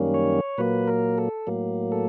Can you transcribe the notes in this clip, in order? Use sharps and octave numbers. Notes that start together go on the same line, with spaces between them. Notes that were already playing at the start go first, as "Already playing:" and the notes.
Already playing: F#2 D#3 G3 A#3 C#4
C#5
A#2 F#3 A#3 B4
A#4
A4
A2 F#3 A#3
A4